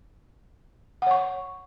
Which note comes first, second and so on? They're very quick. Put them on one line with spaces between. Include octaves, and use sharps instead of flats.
F#5 C#5 C#6